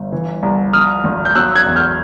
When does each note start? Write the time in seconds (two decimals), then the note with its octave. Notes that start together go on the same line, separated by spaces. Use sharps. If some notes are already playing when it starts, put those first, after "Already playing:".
Already playing: G1
0.12 E3
0.43 C2
0.73 F3 D#6 F6
1.04 G#1
1.25 G6
1.35 F#3 E6 F#6
1.55 F#6 G#6
1.66 E2
1.76 F6 G6